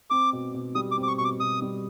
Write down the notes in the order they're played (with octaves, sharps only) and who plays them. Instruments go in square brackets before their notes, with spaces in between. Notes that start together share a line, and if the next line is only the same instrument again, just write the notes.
[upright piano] C4 [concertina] D6
[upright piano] B2
B2
[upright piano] G3 [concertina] D#6
[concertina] D6
[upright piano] C4
[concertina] D6
C#6
[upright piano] B2 [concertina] C#6
[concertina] D6
[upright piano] B2 [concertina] D#6
[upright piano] G3